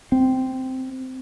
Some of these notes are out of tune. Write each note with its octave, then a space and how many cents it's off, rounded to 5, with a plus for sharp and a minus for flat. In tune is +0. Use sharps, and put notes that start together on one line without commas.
C4 -10